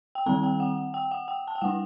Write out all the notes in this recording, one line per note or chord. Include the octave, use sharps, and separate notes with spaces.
G5
D#3 G3 C4 A5
G5
F#5
G5
F#5
G5
A5
G5
G3 D4 F#5